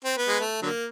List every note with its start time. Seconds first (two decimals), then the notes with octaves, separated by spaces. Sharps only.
0.05 C4
0.17 B3
0.28 G#3
0.40 A3
0.62 D3 F#3 A#3